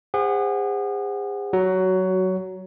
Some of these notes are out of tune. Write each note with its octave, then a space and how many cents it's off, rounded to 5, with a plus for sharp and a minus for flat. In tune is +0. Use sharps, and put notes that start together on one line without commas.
G#4 -40 C5 -5 F#5 +0
F#3 +15 F#4 +0